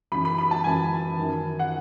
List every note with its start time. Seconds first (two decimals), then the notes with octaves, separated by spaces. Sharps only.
0.12 F#2 E3 B5
0.25 B5
0.38 B5
0.51 A5
0.64 F#2 E3 G#5
1.17 F#2 D#3
1.59 F#5